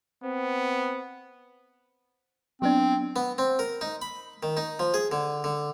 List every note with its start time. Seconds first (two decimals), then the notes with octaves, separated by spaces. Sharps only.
0.24 B3 C4
2.62 F#3 B3 C4 D4
3.16 B3
3.38 C4
3.59 A#4
3.81 D#4
4.02 B5
4.43 D#3
4.57 D#4
4.79 F3
4.94 G#4
5.12 D3
5.44 D3